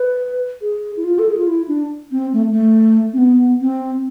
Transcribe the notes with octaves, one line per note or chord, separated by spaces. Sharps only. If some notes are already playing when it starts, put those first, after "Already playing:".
Already playing: B4
G#4
E4
F4
A4
G#4
F4
E4
D4
C4
A3
A3
C4
B3
C4